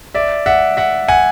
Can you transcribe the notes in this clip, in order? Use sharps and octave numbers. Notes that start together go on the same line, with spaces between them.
D5 E5
E5 F#5
E5 F#5
F#5 G#5